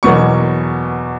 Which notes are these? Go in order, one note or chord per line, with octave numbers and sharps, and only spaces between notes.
E2 B2 F#3 A#3 C#6